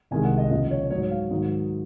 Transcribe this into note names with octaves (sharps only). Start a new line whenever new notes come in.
C2 C3 D#3 G#3 G#5
F#5
D#5
D#2 C#3 F3 D#5
C#5
G#2 F#3 C#5
F5
G#2 D#3 F#3